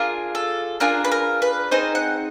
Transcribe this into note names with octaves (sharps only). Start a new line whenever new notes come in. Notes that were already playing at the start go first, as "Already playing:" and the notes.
Already playing: D4 F4 G#4 A#4
A4
D4 F4 G#4 A#4
B4
A#4
B4
C4 D#4 G#4 C5
F#5